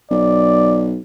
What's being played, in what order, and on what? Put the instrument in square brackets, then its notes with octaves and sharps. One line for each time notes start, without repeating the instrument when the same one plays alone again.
[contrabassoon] B1 [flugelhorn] D5